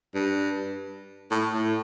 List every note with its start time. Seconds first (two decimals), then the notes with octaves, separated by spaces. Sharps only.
0.15 G2
1.31 A2
1.54 A2